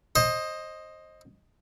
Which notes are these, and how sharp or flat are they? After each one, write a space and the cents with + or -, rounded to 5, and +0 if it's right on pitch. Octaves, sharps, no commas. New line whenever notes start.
C5 +25 D#5 +0